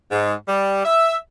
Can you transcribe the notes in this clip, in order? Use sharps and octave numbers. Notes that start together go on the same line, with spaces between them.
G#2
G3
E5